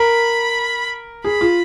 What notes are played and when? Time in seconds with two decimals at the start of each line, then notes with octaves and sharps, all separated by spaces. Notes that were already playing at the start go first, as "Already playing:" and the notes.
Already playing: A#4 B5
1.24 G#4 B5
1.41 F4